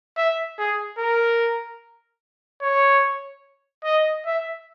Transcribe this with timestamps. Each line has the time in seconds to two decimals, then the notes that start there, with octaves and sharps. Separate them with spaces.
0.17 E5
0.59 G#4
0.99 A#4
2.62 C#5
3.85 D#5
4.26 E5